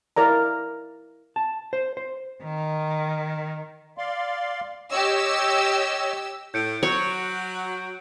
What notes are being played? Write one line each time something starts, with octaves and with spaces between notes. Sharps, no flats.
E4 A#4 D5 A#5
A5
C5
C5
D#3
D5 F5 C6
G4 C#5 D#5 E6
A2 G6 C#7 D7
F#3 F#4 C#5